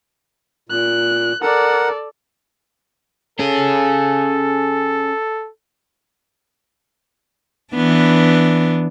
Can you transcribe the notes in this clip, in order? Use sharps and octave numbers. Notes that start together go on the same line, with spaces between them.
A#2 F#6
A4 A#4 D5 F#5
C#4 G#4 A4
E3 B3 D4